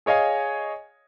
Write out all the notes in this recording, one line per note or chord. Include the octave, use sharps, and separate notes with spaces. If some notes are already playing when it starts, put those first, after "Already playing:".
G#4 C#5 D#5 F5 G#5